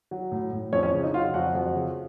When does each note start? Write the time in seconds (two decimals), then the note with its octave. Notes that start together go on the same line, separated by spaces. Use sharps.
0.11 F#3
0.32 A2
0.52 A2
0.73 F2 C#4 C#5
0.83 C#4 C#5
0.93 C#3
1.03 D#4 D#5
1.14 F#3 F4 F5
1.34 F2 F#4 F#5
1.55 F2
1.75 C#3